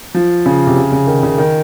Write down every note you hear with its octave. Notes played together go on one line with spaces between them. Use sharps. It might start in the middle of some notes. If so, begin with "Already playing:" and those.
F3
C#3
C3
C#3
C#3
D#3
C#3
D#3